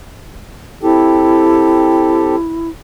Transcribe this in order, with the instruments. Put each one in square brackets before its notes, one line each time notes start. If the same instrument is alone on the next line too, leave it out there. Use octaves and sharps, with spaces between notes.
[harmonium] C4 G4 A4 [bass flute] E4